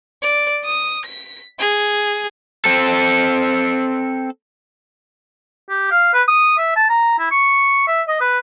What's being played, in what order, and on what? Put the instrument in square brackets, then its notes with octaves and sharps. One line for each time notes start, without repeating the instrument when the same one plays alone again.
[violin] D5
D#6
B6
G#4
[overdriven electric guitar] C4 A4
[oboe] G4
F5
B4
D#6
E5
A5
A#5
E4
C#6
E5
D#5
B4